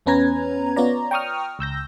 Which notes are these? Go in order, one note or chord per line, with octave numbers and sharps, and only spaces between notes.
E2 B3 C#4 B4 A#5 G#6
B3 F4 C#5 D5 A#5
G5 A#5 C#6 D#6 F6
C#2 E6 G6 A#6